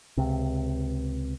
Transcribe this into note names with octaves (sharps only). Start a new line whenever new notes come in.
C#2 C3